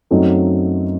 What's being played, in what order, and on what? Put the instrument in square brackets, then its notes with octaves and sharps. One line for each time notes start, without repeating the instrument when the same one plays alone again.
[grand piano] F#2 F#3 A3 C4 D#4